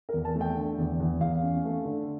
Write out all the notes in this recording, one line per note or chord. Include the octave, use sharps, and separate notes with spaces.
A#4
E2
A5
A3
G5
D3
E2
E2
E2 F5
C#4
A3
D3